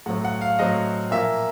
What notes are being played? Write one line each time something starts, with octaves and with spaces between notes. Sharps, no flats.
A2 F#3 A3 C4 F#5
F#5
F5
A2 F#3 A3 C4 D#5
A#2 F3 A#3 E5